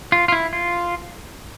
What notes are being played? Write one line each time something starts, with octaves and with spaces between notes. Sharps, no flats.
F4
F4
E4
F4